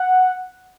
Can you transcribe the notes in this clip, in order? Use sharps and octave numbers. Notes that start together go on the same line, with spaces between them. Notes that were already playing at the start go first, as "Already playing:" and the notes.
Already playing: F#5